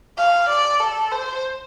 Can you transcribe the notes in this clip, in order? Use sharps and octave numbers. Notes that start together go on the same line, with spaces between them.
F5
D5
A4
C5